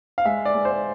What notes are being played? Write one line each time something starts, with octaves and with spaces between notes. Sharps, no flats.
F5
G#3 E5
D5
G#3
C5